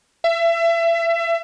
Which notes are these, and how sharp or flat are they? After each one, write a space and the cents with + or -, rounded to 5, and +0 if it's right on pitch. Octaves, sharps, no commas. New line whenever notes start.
E5 +30